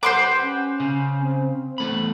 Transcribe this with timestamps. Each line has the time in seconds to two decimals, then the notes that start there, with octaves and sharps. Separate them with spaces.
0.03 G4 B4 C5 F#5 C6 D6
0.41 C#4
0.80 C#3
1.20 C4
1.78 E2 A3 B5